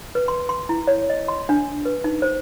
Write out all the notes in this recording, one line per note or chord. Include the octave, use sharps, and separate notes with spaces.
B4
C6
C6
E4
C#5
D#5
C6
D4
B4
D#4
C5